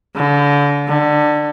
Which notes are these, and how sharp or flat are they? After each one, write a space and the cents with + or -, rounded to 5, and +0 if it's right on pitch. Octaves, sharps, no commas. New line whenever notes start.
D3 -35
D3 +20